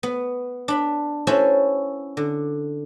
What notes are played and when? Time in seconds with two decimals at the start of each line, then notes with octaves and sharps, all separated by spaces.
0.03 B3
0.68 D4 B5
1.27 C#4 E4 F#4 A4 B4 C5
2.17 D3